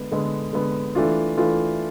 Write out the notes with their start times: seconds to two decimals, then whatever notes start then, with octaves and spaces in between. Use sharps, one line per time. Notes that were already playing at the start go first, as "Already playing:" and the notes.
Already playing: D3 G#3 B3
0.12 D3 G#3 B3
0.53 D3 G#3 B3
0.95 E3 A3 D4 F4
1.38 E3 A3 D4 F4